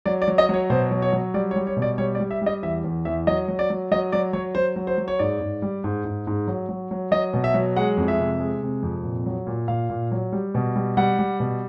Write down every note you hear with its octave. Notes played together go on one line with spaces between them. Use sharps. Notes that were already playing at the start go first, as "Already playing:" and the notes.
F#3 D5
D5
F#3
D#5
F#3 C#5
B2 C5
F#3
C#5
F#3
G3 D5
C#5
G3
C#5
B2
D5
G3 C#5
D5
G3
E5
G3 D#5
E2 E5
E2
E2 E5
F#3 D#5
F#3
D5
F#3
F#3 D#5
F#3 D5
F#3 C#5
F#3 C5
F#3
C5
F#3
C#5
G#2 D5
G#2
G3
G#2
G#2
G#2
F#3
F#3
F#3
F#3 D#5
B2
E5
F#3
G#3 F#5
F2
E5
C3
G#3
C3
F2
A#2
F#3
A#2
A#2 F5
A#2
F#3
G3
B2
G3
G3 F#5
G3
B2